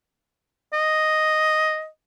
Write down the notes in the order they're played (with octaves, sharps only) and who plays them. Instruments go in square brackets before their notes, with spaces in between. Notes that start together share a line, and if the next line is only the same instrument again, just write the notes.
[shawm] D#5